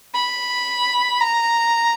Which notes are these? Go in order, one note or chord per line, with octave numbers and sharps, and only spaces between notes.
B5
A#5